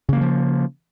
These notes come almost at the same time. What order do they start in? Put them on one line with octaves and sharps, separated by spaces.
C#3 A#3 F#3 F3